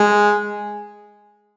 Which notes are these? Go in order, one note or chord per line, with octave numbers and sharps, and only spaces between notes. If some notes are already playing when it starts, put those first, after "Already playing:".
Already playing: G#3